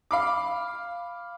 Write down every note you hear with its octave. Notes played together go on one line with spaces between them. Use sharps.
F5 B5 D6